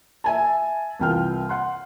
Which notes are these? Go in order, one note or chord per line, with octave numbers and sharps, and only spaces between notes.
E5 G#5 A5
C2 E3 F4 G5 F6
F#5 C6